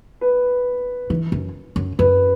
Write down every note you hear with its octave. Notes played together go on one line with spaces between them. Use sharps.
B4
E3
F#2
F#2
F#2 B4